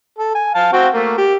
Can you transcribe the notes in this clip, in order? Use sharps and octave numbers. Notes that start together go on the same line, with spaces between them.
A4
G#5
F5 A5
C4 F#4 G5
A3 A#3
G4